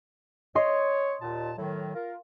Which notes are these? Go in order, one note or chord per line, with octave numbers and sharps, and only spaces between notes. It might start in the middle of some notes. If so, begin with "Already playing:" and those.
C#5 D#5 C6
D#2 A#2 A5
A2 D#3 F#3
F4 A#4